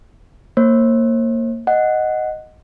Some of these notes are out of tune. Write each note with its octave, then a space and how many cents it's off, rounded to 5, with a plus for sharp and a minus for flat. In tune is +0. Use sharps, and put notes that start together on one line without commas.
A#3 -15 C5 +45
D#5 +0 F#5 +0